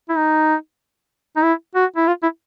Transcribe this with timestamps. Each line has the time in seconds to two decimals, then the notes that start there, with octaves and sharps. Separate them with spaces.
0.09 E4
0.17 D#4
1.36 D#4
1.43 E4
1.75 F#4
1.96 E4
2.07 F4
2.23 E4